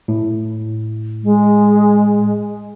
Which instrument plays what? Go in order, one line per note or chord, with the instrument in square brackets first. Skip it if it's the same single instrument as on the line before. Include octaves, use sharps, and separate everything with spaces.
[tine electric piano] A2
[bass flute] G#3